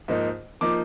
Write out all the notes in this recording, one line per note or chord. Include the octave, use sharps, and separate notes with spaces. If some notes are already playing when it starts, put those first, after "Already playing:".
G#2 F3 A#3 D#4
F3 A#3 D#4 D6